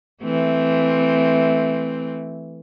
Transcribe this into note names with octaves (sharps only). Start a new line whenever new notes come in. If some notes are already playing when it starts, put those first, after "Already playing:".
E3 A3 C4